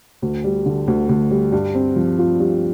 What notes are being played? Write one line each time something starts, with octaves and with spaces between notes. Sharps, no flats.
D2
G3
D3
D2
D2
G3
G2
C4
F3
F4
G2